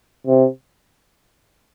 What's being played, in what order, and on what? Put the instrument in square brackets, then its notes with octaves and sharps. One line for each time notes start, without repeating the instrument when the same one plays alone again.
[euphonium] C3